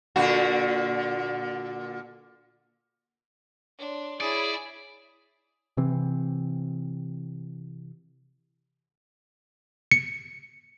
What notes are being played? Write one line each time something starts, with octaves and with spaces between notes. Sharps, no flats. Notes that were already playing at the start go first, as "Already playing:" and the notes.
A#2 D3 F#4
D4 C#5 C6
E4 G#4 C#5 D5
C3 E3 C4
C#7